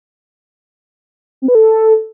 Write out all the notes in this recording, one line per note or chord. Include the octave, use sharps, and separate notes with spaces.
C4
B4
A4